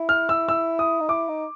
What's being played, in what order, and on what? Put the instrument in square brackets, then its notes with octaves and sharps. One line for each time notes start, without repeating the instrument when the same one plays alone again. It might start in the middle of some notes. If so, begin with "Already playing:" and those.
Already playing: [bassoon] E4
[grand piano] F6
E6
E6
D#6
[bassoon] D#4
[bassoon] E4 [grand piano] D6
[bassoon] D#4